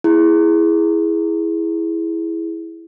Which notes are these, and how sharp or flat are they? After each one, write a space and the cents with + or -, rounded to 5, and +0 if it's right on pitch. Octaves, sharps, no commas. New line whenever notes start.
E4 +0 G#4 +0